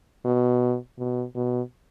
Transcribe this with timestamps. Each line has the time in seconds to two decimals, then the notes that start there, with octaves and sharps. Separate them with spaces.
0.25 B2
0.98 B2
1.36 B2